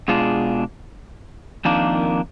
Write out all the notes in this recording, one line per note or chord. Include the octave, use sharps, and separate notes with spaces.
B2 G#3 D4 F4 G#4
F2 D#3 A#3 D4